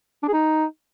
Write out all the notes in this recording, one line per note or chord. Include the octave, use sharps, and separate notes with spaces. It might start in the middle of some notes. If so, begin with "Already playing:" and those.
D4
G#4
D#4